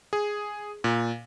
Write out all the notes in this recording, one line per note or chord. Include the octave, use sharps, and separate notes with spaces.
G#4
A#2